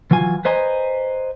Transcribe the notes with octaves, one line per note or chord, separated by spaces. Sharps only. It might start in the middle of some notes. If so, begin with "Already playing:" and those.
E3 F#3 F4 G#5
B4 C5 D#5 G#5 A#5